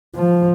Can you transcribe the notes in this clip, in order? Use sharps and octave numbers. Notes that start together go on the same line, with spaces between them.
F3